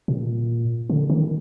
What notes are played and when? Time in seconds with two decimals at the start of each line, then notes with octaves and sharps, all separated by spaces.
0.08 A#2
0.90 D3
1.10 D#3